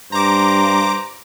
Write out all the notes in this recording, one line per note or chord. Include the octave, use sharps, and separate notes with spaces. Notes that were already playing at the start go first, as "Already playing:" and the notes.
G2 C5 A#5 D6